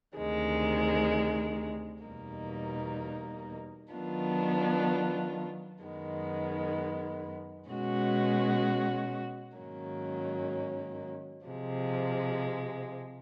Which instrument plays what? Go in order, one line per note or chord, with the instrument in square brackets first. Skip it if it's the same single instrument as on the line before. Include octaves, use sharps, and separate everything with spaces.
[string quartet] D2 C3 D#3 G#3
E2 B2 G3 A#3 D#4
D#3 F#3 B3 D4 F4
F#2 D#3 G#3 B3
B2 G#3 C#4 F#4
G#2 D#3 F#3 A#3 C#4
C3 F3 G#3